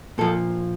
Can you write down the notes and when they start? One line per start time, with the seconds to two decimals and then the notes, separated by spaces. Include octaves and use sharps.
0.18 A#2 F3 A4